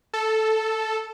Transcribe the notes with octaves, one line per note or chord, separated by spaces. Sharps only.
A4